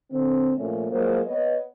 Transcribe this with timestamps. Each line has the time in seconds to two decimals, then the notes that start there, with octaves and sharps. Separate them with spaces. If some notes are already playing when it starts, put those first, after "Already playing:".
0.11 D3 C4
0.57 A#2 F3 A3 C#4
0.91 F#3 G#3 A#3 F4 C5
1.26 B3 B4 C#5 D#5